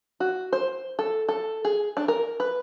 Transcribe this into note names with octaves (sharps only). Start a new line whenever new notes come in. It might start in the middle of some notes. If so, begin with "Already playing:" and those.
F#4
C5
A4
A4
G#4
D4
A#4
B4